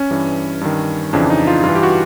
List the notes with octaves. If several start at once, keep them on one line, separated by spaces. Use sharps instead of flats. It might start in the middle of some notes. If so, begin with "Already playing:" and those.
Already playing: C#4
G2 E3
G2 D#3
F2 C#3 E3 D4
D#4
F4
G2 F4
E3
G4
F#4